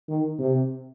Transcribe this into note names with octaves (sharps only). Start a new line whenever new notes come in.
D#3
C3